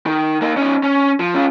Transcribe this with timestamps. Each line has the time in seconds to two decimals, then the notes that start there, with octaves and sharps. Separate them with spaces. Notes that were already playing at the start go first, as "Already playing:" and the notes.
0.06 D#3
0.42 A#3 D#4
0.57 C#4 D#4
0.83 C#4
1.20 F3
1.35 C#4 F4